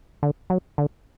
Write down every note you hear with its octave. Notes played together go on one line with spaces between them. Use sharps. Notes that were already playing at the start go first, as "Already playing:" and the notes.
D3
F#3
D3